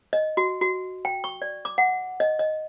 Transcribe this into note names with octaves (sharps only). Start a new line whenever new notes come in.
D#5
F#4
F#4
G5
C#6
D5
D6
F#5
D#5
D#5